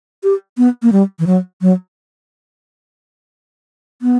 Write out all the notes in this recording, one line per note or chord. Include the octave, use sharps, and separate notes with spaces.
G4
B3
A#3
G3
E3
F#3
F#3
B3